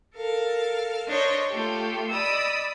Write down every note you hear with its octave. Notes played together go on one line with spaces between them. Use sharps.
A4 A#4 F5
D4 A#4 C5 C#5 D#5
A3 F4 G4 A4
D5 D#5 B5 D#6 E6